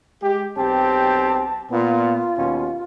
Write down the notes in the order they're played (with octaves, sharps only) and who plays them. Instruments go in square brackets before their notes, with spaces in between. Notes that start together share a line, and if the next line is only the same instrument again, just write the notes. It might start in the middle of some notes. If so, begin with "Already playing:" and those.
[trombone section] G#3 G4
[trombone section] B1 C4 G4 [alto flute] A5
[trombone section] A#2 B3 [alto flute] F4
[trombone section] D#2 B2 C#4